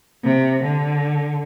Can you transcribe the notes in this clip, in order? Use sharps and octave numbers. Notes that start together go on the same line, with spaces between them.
C3
D3